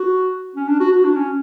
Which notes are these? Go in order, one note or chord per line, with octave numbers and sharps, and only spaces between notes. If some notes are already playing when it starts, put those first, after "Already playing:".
Already playing: F#4
C#4
D4
F#4
F#4
D4
C#4